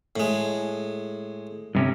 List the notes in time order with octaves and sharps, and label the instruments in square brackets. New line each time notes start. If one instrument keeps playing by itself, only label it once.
[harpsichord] A2 G#3
[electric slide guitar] G2 C3 C#4